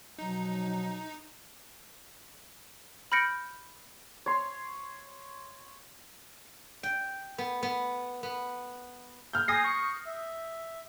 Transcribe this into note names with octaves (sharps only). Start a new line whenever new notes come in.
B2 F3 F#3 D#4
B5 F6 G6 A#6 C#7 D7
C#5 C6
G5
B3
B3
B3
F6 G6
G#5 D#6 A#6 C7
C#6
E5